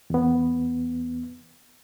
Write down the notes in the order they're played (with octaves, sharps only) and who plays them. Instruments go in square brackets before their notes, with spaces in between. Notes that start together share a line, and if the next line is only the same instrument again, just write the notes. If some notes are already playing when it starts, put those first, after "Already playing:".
[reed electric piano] E2 B3